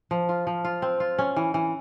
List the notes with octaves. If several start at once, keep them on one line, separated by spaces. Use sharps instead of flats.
F3
F4
F3
F4
C4
F4
C#4
E3
E3